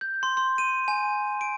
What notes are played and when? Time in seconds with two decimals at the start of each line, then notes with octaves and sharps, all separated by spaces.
0.01 G6
0.23 C6
0.37 C6
0.58 D#7
0.88 G#5
1.41 D7